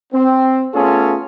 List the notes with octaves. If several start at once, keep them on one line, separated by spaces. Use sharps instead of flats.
C4
A3 B3 C#4 F4 G#4 A4